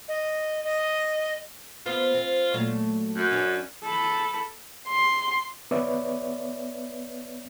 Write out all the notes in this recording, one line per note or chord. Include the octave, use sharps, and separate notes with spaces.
D#5
D#5
B3 F4 C5
C4
A#2 F#3 A3
F#2
C#4 D4 C#5
A4 B5
C6
B3 B4 C#5 D5 E5